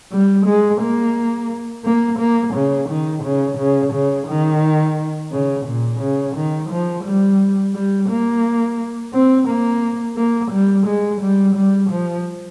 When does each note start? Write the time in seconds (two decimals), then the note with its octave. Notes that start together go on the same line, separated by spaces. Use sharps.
0.12 G3
0.46 G#3
0.81 A#3
1.85 A#3
2.19 A#3
2.54 C#3
2.89 D#3
3.24 C#3
3.58 C#3
3.93 C#3
4.28 D#3
5.31 C#3
5.66 A#2
6.00 C#3
6.36 D#3
6.70 F3
7.05 G3
7.74 G3
8.10 A#3
9.13 C4
9.48 A#3
10.17 A#3
10.51 G3
10.87 G#3
11.22 G3
11.56 G3
11.91 F3